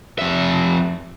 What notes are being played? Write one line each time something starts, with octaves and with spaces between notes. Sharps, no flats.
F2 E5